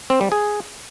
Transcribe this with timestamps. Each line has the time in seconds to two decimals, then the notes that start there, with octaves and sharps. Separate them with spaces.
0.10 C4
0.21 G3
0.32 G#4